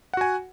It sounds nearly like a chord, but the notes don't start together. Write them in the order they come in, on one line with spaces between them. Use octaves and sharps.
F#5 F#4 G#5